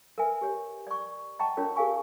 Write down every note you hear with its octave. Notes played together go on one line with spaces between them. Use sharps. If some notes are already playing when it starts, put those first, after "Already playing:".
A#4 B4 E5 G#5
G4 C#5
D5 C#6
D#5 F#5 G5 A5 A#5 C#6
C#4 F4 A#4 C#5
G4 G#4 A#4 F5 G#5 C#6